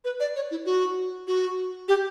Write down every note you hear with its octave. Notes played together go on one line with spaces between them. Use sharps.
B4
D5
C#5
E4
F#4
F#4
G4